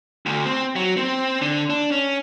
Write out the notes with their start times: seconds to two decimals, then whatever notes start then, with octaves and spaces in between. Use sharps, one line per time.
0.26 D2
0.46 C4
0.76 F#3
0.97 C4
1.41 D3
1.70 D4
1.91 C#4